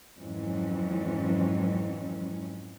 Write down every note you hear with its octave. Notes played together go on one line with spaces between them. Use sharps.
F2 G#2 E3 F#3 C#4